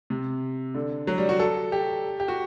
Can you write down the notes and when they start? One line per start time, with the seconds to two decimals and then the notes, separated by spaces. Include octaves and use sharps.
0.10 C3
0.75 D3
1.07 F#3
1.18 G3
1.29 F#4
1.39 A4
1.72 G4
2.20 G4
2.28 F#4